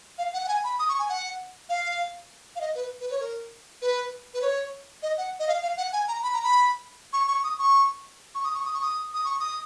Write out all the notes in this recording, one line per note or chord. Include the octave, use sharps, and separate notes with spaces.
F5
F#5
F#5
G#5
B5
D#6
C#6
G#5
F#5
F5
F5
D#5
B4
B4
C#5
A#4
B4
B4
C#5
D#5
F#5
D#5
F5
F5
F#5
G#5
A#5
B5
A#5
B5
C#6
C#6
D#6
C#6
C#6
D#6
C#6
D#6
C#6
D#6
D#6
C#6
D#6